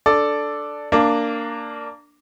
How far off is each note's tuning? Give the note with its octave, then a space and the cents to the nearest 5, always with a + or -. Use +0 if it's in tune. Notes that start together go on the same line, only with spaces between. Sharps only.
D4 +0 A4 +0 D5 +0
A#3 -15 D4 +0